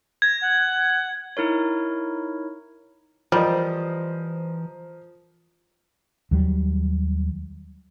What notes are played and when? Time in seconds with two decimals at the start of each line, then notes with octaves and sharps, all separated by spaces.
0.22 G#6 A#6
0.41 F#5
1.37 D#4 E4 A#4 C#5
3.32 E3 F3 G3 A#4 C5 D#5
6.31 D#2 F#3 G3